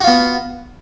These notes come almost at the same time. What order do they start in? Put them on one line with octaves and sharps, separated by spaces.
F#4 F4 B3